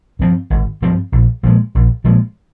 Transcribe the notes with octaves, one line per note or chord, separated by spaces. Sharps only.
G2 F3 C4
G#1
G2 F3 C4
A#1
A#2 F3 G#3
A#1
A#2 F3 G#3